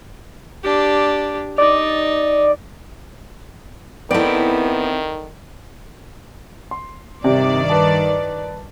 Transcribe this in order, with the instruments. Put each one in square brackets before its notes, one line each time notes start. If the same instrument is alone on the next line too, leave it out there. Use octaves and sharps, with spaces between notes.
[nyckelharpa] D4 G4
[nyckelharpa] D#4 [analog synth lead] D5
[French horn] D#3 [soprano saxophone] B3 [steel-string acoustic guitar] C4 E4 [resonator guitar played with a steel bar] A4 D5
[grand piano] C6
[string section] G2 D#3 D5 [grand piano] C3
[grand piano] B4 A5